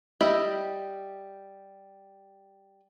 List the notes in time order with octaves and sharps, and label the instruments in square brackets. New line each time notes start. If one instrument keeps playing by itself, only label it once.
[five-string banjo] G3 G4 D#5 E5 B5